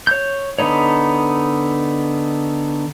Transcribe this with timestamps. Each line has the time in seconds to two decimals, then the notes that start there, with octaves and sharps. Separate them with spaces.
0.07 C#5 G6
0.59 D3 B3 D#4 C#5